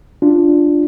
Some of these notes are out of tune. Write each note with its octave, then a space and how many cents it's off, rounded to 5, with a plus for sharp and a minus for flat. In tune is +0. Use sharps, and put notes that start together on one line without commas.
D4 +0 F4 -10